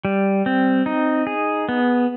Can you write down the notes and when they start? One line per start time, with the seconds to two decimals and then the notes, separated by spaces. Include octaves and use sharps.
0.05 G3
0.46 C4
0.86 D#4
1.27 G#4
1.69 B3